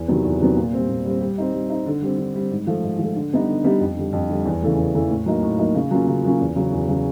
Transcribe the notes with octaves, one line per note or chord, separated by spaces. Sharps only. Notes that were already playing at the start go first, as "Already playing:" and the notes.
Already playing: E2
C3 D#3 F#3 B3
E2
C3 D#3 F#3 B3
A#2
G3 C4
A#2
G3 C4
G3
C4 D#4
G3
C4 D#4
D3
G3 C4
D3
G3 C4
G#2
F3 A3
G#2
F3 A3
D3
G3 B3 D#4 G4
D3
G3 B3 D#4 G4
F2
D3 G3
F2
D3 G3
E2
C#3 E3 A3
E2
C#3 E3 A3
A2
F#3 A#3 D#4
A2
F#3 A#3 D#4
C#3
F#3 A#3 C#4 F4
C#3
F#3 A#3 C#4 F4
E2
C#3 F#3
E2
C#3 F#3